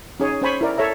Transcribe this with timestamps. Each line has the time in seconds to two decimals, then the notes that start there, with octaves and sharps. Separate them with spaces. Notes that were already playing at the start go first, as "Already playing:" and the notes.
0.20 C#4 D#4 G#4 C#5
0.42 C#4 C5 G#5 B5 C#6
0.61 E4 A#4 D5
0.78 A4 C#5 E5 A#5